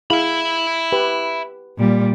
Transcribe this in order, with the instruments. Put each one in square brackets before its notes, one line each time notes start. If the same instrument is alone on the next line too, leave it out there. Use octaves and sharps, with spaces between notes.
[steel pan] E4 G#4 F5 [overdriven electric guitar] E5 B5
[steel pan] G4 B4
[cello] A#2 G3